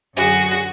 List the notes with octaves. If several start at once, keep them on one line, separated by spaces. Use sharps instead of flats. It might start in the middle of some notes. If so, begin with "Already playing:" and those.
F#2 D3 F#4 G#4